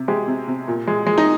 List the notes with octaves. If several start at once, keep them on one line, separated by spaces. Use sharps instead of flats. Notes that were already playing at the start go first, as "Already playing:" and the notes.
Already playing: C3
G#3 G4
C3
C3
A#2
G#3
G#3
D#4